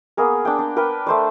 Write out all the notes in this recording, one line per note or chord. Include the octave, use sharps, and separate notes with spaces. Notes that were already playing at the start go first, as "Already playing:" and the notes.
A#3 B3 G#4 A#4
D4 G5
D4
A#4 B4 G5
A3 C5 D5